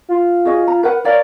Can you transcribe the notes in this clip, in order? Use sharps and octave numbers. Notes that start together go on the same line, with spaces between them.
F4
F#4 G#4 D#5
A#5
A#4 B4 F#5
A#4 C#5 D5 F5